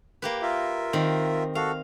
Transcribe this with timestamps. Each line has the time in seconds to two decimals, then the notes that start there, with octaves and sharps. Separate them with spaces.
0.22 A#3 G4 B4
0.42 F4 A#4 E5
0.93 D#3 C4
1.55 F#4 A4 F5